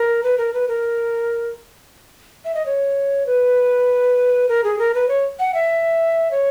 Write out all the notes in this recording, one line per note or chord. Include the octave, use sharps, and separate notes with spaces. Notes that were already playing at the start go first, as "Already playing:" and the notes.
Already playing: A#4
B4
A#4
B4
A#4
E5
D#5
C#5
B4
A#4
G#4
A#4
B4
C#5
F#5
E5
C#5